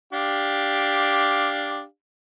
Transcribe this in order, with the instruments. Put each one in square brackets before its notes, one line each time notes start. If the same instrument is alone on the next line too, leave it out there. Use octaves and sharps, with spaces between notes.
[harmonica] D4 G4 F5